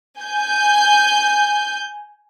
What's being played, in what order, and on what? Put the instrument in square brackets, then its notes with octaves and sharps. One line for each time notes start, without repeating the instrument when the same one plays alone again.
[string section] G#5 G6